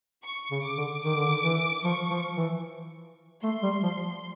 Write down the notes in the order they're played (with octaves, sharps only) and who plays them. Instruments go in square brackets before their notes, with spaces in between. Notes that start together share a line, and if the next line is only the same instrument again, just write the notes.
[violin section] C#6
[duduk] C#3
[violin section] D6
[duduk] D3
[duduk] D#3 [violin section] D6
[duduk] D3
D#3
E3
[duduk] F3 [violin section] C#6
[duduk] F3
E3
[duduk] A3 [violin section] C6
[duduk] G3
F3